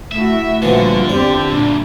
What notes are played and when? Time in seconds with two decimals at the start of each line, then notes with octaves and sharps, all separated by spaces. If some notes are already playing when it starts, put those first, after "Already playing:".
0.12 A3 E4 F#4 E5
0.62 A#2 D3 E3 F3 G3 F4 F#4
1.09 E2 C4 F4 G4 D5
1.51 D2 G2 A#2 D4